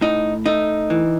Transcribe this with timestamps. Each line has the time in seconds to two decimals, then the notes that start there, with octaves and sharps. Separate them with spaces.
0.01 A2 D#4
0.46 A3 D#4
0.90 E3